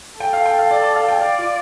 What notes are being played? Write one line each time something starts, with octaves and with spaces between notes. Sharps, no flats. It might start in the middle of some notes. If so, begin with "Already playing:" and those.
A4 G5
F5
G5
F5
D5
D5
F5
G5
D5 F5
F4